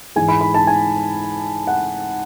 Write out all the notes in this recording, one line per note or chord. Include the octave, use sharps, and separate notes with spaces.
G#2 E3 G#3 G#5
B5
B5
A5
G#5
F#5